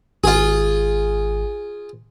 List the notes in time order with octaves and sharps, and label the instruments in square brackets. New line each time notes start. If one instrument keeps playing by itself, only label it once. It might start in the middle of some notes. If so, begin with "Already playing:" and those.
[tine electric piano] G#1 [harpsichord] F4 G#4